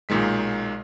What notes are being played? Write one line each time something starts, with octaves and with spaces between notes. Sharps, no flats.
B1 A#2 D#3 G#3 B6